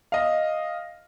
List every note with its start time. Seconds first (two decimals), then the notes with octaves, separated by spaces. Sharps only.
0.12 D#5 F5